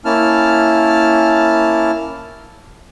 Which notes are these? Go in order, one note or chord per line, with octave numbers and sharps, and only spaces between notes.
A#3 C#4 E4 A5 F6